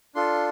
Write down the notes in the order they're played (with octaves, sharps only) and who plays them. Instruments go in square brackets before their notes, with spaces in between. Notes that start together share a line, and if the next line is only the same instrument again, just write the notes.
[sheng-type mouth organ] D4 F4 A4 C6